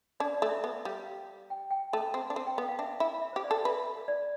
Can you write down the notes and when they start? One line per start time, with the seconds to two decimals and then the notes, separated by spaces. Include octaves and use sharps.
0.20 D4 D5
0.34 D5
0.42 A3
0.49 E5
0.64 B3 E5
0.85 G3 F5
1.06 F5
1.50 G5
1.71 G5
1.93 A3 A5
2.14 C4
2.30 D4
2.36 C4 A5
2.47 G5
2.58 B3 F5
2.69 F5
2.79 D4 E5
3.00 E4
3.22 E5
3.33 G4 C5
3.44 D5
3.51 A4
3.65 B4 E5
4.08 D5